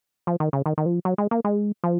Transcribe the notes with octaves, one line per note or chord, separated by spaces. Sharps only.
F3
D#3
C#3
D#3
D#3
F3
F#3
G#3
A#3
G#3
F3